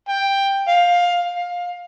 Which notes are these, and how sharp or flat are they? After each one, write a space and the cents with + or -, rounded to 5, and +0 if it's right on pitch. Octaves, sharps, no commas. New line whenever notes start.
G5 +10
F5 +15
F5 +20